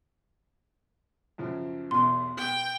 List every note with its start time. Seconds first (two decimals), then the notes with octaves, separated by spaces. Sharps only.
1.38 F#2 C#3 F3
1.91 B1 E2 B2 C6
2.37 B2 G5